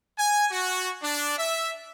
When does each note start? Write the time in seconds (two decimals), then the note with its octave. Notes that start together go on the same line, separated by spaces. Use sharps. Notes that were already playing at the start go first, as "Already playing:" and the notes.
0.19 G#5
0.51 F#4
1.03 D4
1.39 E5